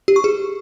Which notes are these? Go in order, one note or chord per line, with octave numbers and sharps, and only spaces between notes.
G4
C#6
G#4